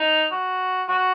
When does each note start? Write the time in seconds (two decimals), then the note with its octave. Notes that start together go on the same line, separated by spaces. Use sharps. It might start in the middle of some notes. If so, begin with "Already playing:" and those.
Already playing: D#4
0.32 F#4
0.88 F#4